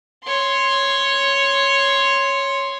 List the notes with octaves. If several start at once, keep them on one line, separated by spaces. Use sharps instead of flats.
C#5 C6